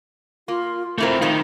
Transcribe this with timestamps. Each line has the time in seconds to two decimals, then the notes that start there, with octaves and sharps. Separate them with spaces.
0.48 A#3 F4
0.98 A3 A#3 C4 E4 F4 A#4
1.22 F2 A#2 D#3 F3 D#4